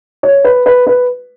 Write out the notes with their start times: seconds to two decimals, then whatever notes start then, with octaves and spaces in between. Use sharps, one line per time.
0.23 C#5
0.44 B4
0.66 B4
0.87 B4